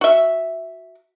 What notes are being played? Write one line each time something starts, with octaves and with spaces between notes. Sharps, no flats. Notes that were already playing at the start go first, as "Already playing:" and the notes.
F#4 E5